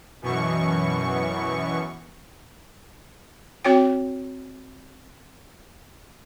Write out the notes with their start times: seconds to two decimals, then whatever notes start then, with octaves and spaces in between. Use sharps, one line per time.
0.22 F#2 B2 E3 C#6
3.65 C4 F#4 C#5 G5